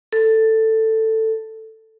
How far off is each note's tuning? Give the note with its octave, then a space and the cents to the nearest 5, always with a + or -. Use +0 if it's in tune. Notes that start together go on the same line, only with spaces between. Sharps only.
A4 +10